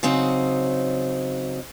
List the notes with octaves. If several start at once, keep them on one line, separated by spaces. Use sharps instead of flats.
C#3 F#3 C4 D#4